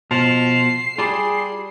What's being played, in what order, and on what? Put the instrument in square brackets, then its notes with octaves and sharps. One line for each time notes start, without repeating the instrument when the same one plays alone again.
[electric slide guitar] B2 [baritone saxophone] F3 [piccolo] C7
[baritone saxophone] G3 [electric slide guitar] F4 D5 A5 [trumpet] G#4